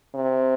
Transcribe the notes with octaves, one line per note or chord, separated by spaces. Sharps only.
C3